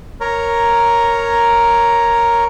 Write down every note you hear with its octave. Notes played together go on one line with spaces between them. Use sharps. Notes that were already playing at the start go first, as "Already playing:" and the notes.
A#4 C#5 A#5